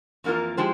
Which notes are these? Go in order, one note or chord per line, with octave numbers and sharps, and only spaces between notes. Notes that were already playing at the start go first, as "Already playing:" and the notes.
F2 E3 A#3 F4 A#4
F3 G#3 E4 G4 C5